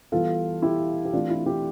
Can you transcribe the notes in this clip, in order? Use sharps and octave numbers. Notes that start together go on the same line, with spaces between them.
E3 G3 B3 F4 A4
E4 G4
G4
E3 A3 C4 D4 F4
E4
E4 G4